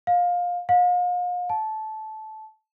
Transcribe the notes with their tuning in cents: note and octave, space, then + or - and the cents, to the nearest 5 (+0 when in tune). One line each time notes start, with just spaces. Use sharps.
F5 +20
F5 +40
A5 -15